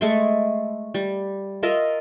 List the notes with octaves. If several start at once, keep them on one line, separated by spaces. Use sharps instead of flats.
G#3 A3 C6
G3
F4 A#4 D#5 E5